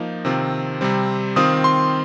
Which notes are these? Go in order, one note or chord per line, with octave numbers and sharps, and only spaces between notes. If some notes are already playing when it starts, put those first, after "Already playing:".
Already playing: F3 A#3 D#4
C3 D#3 C4 F4
C3 G3 C4
D#3 C4 F4 D#6
C6